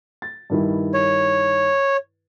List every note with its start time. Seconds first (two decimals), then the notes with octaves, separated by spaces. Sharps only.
0.22 A6
0.50 G2 D#3 E4
0.94 C#5